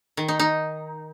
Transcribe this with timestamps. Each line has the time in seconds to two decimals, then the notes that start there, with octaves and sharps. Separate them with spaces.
0.17 D#3
0.28 D#4
0.39 D#4